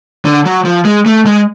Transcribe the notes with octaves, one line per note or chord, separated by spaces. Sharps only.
D3
F#3
F3
G#3
A3
G#3